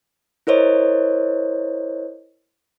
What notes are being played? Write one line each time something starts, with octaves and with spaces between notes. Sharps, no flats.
E4 A#4 C5 C#5 D#5